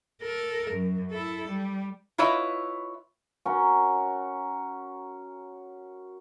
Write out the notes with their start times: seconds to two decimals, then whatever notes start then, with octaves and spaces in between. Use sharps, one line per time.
0.22 A4 A#4
0.71 F#2
1.12 E4 A4
1.48 G3
2.18 E4 F4 B4 C#5 D#5 E5
3.46 C#4 F#4 A#4